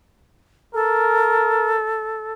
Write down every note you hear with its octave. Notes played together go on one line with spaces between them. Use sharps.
A4 A#4